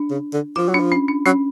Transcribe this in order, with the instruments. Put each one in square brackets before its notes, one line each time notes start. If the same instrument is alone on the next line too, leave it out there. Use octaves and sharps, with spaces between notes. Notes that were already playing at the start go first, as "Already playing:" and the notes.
Already playing: [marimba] D4
[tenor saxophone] C#3
D3
[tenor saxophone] F3 [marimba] F4
[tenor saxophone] F#3
[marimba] D4
[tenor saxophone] F3
[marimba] C#4
D4
[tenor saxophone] F#3 [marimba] C#4